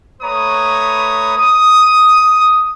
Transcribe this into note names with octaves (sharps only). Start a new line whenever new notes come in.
A3 B4 C#5 A#5 B5 D#6
D#6